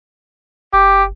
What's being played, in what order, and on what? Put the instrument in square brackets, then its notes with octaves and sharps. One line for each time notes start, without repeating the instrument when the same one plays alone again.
[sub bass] F#1 [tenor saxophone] G4